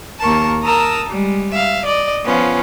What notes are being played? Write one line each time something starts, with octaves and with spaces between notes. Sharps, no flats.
D#2 A#3 A#4 A5 C#6
A#4 A5 A#5 D#6 E6
G3 G#3
E5 F5
D5 D#5
F3 B3 C#4 F4